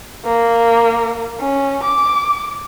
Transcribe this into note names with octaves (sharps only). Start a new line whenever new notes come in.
A#3
C#4
D6